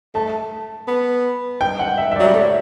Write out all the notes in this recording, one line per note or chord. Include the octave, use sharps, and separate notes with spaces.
A3 A5
B3
G5
F#5
E5
E5
F#3 D5
G3
A3 C#5